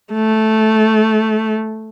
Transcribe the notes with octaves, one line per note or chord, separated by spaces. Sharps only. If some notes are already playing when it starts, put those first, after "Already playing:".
A3